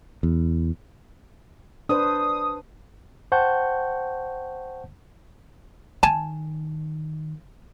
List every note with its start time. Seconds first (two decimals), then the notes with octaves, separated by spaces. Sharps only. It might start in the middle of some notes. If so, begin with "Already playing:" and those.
0.23 E2
1.89 D4 B4 C5 D#6
3.32 C5 F#5 G5 A5 C#6 G6
6.03 D#3 G#5 A5